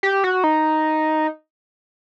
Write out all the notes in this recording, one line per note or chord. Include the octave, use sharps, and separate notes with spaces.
G4
F#4
D#4